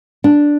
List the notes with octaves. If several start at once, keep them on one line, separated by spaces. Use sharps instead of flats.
D4